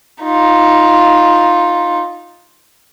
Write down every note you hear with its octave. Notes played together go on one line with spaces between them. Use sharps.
D#4 F4